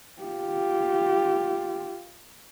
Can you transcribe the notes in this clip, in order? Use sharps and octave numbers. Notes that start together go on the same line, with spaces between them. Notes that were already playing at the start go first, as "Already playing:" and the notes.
F4 G4